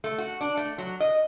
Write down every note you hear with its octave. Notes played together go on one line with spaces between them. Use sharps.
A3
F#4
D4
A3
F#3
D#5